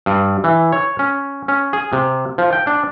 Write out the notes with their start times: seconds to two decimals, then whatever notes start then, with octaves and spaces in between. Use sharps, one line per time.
0.06 G2
0.44 E3
0.72 C#5
0.99 C#4
1.48 C#4
1.73 G#4
1.93 C3
2.38 F3
2.53 G5
2.67 D4